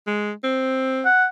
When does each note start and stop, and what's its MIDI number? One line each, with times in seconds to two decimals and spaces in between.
0.07 0.32 56
0.44 1.05 60
1.05 1.26 78